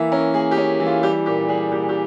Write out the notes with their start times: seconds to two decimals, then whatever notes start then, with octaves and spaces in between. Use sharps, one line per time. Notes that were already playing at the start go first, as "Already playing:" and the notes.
Already playing: E3 A#3 E5
0.12 C#4 A#4
0.34 A#3 G#4
0.51 G4
0.58 C#4
0.80 E3
0.86 F4
1.03 G3 G4
1.26 A#2 G4
1.49 G3 G#4
1.72 A#2 G4
1.89 G4